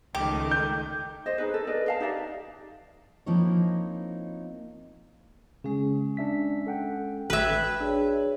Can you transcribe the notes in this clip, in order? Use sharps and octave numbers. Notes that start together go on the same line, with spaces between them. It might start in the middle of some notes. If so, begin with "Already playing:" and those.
C#2 D#3 A3 G4
G6
C5 D#5
D#4 G#4 B4
A4
A#4 B4 D5 D#5
D#5 F5 A5
D#4 G4 D5 E5
F3 A#3 C4 D#4 E4 C#5
C#3 G#3 C#4
D4 E5 B6
A4 F#5 G5
A1 F#4 B4 E5 G5 G#6
D4 G#4 C#5